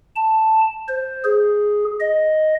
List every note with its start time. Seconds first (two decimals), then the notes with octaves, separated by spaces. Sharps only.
0.16 A5
0.89 C5
1.25 G#4
2.00 D#5